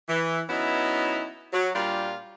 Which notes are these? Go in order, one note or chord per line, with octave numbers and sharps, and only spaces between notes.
E3
F#3 B3 C#4 D#4 E4
F#3
A#2 G3 D4 F4 G4 A#4